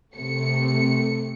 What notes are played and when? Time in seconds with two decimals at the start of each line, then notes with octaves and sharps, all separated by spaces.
0.16 C3 A3 C#7